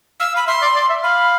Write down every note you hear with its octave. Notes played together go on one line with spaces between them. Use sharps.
F5 E6
F5
B5
E5 C6
D5
D5
E5
F5 B5